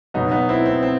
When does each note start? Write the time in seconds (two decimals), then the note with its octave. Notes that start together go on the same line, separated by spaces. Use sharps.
0.14 B2 F#3 B3 D#4
0.31 B3 D#4
0.49 C4 E4
0.66 C4
0.82 C4